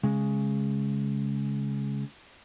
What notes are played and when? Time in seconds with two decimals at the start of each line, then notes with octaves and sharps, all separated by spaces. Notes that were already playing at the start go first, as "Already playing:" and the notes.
0.03 C#3 G#3